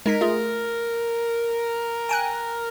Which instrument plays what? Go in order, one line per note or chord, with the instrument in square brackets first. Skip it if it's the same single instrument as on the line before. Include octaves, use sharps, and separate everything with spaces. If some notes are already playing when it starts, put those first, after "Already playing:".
[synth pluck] G#3 D#4 B6 [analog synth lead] A#4
[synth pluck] A3 F4 G#4
G5 G#5 F#6